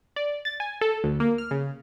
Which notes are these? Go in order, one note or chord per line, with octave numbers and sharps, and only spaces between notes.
D5
A6
G#5
A4
D2
A#3
F6
C#3